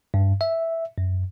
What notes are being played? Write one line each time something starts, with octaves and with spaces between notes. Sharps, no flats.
G2
E5
F#2